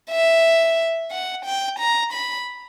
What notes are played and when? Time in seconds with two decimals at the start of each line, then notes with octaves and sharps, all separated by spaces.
0.10 E5
1.11 F#5
1.45 G5
1.79 A#5
2.13 B5